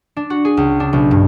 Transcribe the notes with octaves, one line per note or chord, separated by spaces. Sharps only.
D4
F#4
G#4
C#2
D4
B1
G2